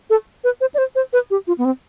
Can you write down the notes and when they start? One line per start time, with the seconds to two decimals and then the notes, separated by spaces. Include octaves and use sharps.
0.10 A4
0.44 B4
0.61 C5
0.74 D5
0.78 C5
0.95 C5
1.13 B4
1.31 G4
1.47 F4
1.58 B3
1.65 C4